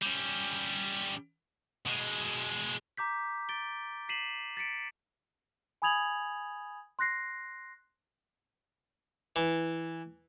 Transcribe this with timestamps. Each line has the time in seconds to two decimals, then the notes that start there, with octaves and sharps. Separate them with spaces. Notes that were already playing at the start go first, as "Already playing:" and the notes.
0.02 G3 C#4
1.86 B2 G#3
2.97 A#5 D6 G6 B6
3.49 A6 D7 G7
4.09 B6 C7 D#7 E7 F#7
4.57 A6 B6 C#7 D7
5.82 G#5 B5 D#6 G#6 F7 F#7
6.99 C6 F#6 A#6 C7
9.36 E3